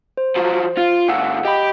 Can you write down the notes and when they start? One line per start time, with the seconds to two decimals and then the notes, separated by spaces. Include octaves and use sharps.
0.17 C5
0.36 F3 F#3
0.77 F4
1.08 A#2 E3 F5 F#5 E6
1.45 G4 D#5 B5